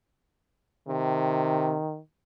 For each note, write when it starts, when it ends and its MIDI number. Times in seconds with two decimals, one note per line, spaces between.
0.88 1.78 48
0.88 1.99 51